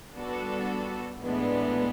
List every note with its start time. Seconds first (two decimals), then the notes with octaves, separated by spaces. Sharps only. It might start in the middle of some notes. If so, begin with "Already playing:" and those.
0.15 G3 B3 D4 F#4 A4
1.20 A2 E3 G#3 B3 D4